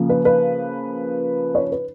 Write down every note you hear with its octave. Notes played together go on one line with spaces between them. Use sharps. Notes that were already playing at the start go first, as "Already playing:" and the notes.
Already playing: C#3 F3 A#3
B4
B4
C#5
B4